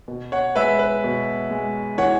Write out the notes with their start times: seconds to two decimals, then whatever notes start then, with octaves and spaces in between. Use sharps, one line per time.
0.08 B2
0.32 C#5 F#5
0.55 G#3 B4 E5
0.79 B4
1.04 B2
1.51 G#3
1.98 E3 C#5 F#5